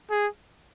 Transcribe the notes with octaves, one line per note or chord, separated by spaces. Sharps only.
G#4